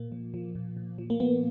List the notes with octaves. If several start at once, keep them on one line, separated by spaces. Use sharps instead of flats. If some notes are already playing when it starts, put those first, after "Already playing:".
Already playing: A#2 A#3
F3
F3
A#2
A#2
F3
A#3
F3 B3